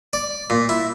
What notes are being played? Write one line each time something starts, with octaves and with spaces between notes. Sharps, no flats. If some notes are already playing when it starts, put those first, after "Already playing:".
D5
A#2
E4